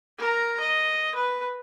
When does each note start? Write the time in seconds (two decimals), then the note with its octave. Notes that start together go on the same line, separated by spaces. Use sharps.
0.18 A#4 A#5
0.60 D#5
1.15 B4